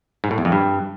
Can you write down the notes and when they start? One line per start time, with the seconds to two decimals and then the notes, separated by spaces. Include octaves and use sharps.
0.24 G#2
0.31 A2
0.38 E2
0.45 F2
0.52 G2